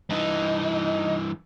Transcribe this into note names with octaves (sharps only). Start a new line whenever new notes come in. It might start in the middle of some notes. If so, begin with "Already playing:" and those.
G2 E3 D#4